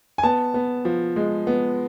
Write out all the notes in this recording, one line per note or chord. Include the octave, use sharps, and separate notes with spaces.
G#5
B3 A5
B3
F3
G#3
B3